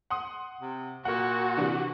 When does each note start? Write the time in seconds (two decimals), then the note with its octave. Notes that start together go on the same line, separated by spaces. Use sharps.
0.10 F#5 C6 D#6
0.61 C3
1.05 A#2 F#4 A#4 F#5
1.57 C3 E3 D4